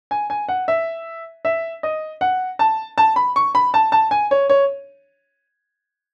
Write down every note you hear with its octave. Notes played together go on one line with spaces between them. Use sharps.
G#5
G#5
F#5
E5
E5
D#5
F#5
A5
A5
B5
C#6
B5
A5
A5
G#5
C#5
C#5